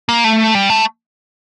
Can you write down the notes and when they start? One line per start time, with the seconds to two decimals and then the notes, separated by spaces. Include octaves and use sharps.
0.09 A#3
0.24 A3
0.55 G3
0.70 A3